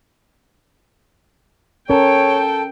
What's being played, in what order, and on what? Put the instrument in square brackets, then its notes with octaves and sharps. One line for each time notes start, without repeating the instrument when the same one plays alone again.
[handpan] C#4 A#4 [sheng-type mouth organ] A4 [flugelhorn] C#5 [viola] G5